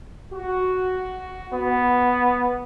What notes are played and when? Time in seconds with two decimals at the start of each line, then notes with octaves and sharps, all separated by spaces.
0.33 F#4
1.53 B3